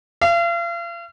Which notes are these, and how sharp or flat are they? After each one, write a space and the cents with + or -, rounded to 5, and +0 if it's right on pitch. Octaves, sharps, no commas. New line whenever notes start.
F5 -40